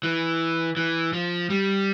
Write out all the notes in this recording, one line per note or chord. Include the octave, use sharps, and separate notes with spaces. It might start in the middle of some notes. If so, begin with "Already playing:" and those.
E3
E3
F3
G3